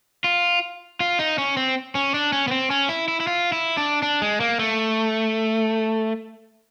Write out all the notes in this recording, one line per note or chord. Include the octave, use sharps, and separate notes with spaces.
F4
F4
D#4
C#4
C4
C#4
D4
C#4
B3
C4
C#4
E4
E4
E4
F4
E4
D4
D4
G#3
A#3
A3